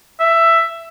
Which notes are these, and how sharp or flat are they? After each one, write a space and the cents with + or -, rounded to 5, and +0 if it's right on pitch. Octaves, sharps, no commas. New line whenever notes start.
E5 +10